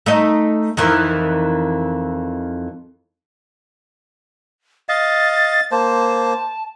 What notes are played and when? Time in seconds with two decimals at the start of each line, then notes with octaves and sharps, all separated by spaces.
0.06 A3 D#4 D#5
0.77 F2 D#3 E3
4.89 D#5 F5 A6
5.72 A#3 C5 A5